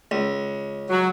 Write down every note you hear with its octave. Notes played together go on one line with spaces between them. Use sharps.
C#2
F#3